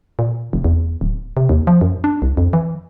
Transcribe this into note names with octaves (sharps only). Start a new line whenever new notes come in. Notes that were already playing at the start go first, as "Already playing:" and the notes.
A#2
F1
E2
D1
C3
D#2
F3
F#2
D4
C2
F2
E3